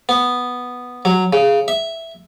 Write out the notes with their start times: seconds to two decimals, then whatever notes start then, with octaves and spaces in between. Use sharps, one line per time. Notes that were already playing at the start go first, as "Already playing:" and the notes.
0.09 B3
1.05 F#3
1.33 C#3
1.68 E5